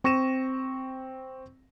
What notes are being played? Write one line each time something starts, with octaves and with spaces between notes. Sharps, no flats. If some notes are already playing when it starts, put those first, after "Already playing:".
C4 C#6 A#6 D#7 E7